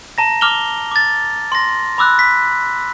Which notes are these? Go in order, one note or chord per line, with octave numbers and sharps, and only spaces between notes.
A5 A#5 A#6
D6 F6 F7 G7
D6 A6
C6 A#6
B5 D6 E6 F#6
B6